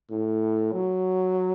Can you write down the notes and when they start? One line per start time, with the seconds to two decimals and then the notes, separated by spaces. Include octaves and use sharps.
0.11 A2
0.73 F#3